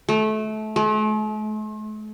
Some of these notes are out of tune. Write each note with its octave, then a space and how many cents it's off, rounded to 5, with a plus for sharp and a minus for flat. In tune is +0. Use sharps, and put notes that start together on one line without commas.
A3 -25
A3 -45